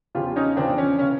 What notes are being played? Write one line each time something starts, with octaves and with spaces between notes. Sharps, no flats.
E2 C#3 F3 F4 G4
C#4 D#4
E2 C#3 F3 C4 D4
C#4
C#3 E3 C#4